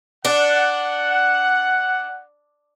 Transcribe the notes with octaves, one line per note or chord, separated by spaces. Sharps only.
D4 F#5